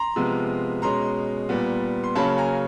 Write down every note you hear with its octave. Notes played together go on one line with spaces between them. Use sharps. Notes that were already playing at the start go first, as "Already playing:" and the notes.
Already playing: A#5 C6
C3 F3 G#3 B3
B2 G#3 C#4 A#5 C6
A#2 G3 B3
C6
C#3 F#3 A#3 C#4 A5 B5
G#5 A#5